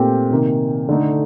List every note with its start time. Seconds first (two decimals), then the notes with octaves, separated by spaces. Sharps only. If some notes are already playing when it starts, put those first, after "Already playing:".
Already playing: A#2 A3 C4 G4
0.31 C3 D#3 A#3
0.89 D3 A3 D#4